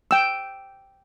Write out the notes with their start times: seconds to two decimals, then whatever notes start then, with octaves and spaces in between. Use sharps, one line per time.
0.11 G5 E6